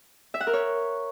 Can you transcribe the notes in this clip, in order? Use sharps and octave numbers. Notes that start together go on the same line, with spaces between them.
E5
F#5
A#4
C#5